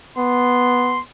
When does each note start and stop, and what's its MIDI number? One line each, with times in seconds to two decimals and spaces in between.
0.17 1.02 59
0.17 1.01 84